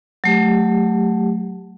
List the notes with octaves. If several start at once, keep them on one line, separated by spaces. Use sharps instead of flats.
F#3 A3 G4